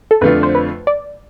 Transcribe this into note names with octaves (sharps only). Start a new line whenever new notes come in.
A4
F2 D3 A3 D4 F4 B4
C5
B4
D5